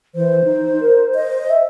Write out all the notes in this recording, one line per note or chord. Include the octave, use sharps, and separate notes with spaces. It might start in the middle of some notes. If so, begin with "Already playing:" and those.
E3 C5
D#4
A#4
D#5
E5